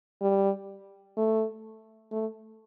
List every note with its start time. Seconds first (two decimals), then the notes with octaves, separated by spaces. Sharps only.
0.22 G3
1.17 A3
2.11 A3